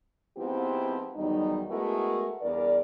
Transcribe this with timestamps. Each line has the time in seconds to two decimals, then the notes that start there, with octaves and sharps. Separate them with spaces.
0.37 G#2 F3 B3 C4 E4 G4
1.16 E2 D#3 F#3 G3 D#4
1.70 G#3 A3 B3 E4 F#4 A#4
2.41 E2 G2 A#4 D5